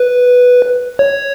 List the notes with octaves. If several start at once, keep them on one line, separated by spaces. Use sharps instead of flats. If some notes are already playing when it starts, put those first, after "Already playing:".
Already playing: B4
C#5